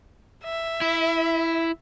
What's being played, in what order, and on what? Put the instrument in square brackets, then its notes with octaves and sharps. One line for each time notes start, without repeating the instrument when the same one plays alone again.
[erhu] E5
[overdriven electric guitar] E4